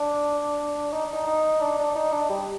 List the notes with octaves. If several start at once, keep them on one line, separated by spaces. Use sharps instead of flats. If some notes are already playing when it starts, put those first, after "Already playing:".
Already playing: D4
D#4
D#4
D#4
D4
D4
D#4
D4
G3